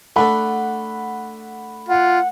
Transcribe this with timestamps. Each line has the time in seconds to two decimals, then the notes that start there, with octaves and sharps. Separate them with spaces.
0.16 A3 D4 A4 F#5 B5
1.89 F4 F#5